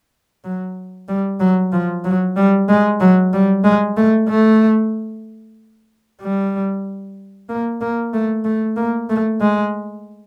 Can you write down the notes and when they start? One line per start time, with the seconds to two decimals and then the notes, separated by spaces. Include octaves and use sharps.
0.44 F#3
1.08 G3
1.40 F#3
1.72 F3
2.04 F#3
2.37 G3
2.69 G#3
3.00 F#3
3.33 G3
3.64 G#3
3.97 A3
4.29 A3
6.21 G3
7.49 A#3
7.81 A#3
8.13 A3
8.45 A3
8.77 A#3
9.10 A3
9.41 G#3